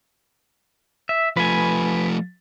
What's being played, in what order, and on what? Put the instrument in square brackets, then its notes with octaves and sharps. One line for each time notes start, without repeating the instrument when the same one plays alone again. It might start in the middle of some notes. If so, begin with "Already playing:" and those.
[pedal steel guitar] E5
[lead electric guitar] F3 A3 [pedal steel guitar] B4 G#5